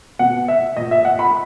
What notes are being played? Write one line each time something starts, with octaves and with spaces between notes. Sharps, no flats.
B2 F#5
E5
A#2 D#5
E5
F#5
B5